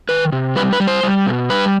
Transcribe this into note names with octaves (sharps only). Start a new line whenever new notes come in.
D#3 B4
C3
G3 B4
B4
G3
C5
G3
B2
G3 B4